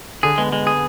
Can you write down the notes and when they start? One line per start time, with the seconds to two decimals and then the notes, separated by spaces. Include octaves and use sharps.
0.23 D3 G#4
0.38 G#3 B3
0.52 G#3
0.67 G#4